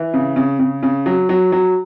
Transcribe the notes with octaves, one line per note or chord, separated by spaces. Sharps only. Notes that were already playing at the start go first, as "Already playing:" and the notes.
Already playing: E3
C#3
C#3
C#3
C#3
F#3
F#3
F#3